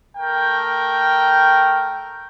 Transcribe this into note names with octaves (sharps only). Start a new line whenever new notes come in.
A3 A#4 G5